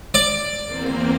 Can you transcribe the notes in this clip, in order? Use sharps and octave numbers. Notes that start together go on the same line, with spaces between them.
D5
E2 A#3 C4